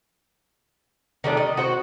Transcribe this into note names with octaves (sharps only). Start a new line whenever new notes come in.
D#3 G3 A3 D4
D#5
F#4 C5